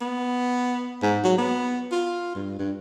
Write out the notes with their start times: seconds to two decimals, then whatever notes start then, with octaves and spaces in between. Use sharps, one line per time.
0.01 B3
1.02 G#2
1.24 F#3
1.38 B3
1.92 F4
2.35 G2
2.59 G2